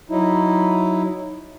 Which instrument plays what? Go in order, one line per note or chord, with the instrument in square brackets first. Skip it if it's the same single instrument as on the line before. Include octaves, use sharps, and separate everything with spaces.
[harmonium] F#3 D#4 E4